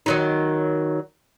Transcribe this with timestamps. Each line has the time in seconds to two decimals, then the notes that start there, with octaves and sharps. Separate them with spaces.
0.06 D#3 F#3 D#4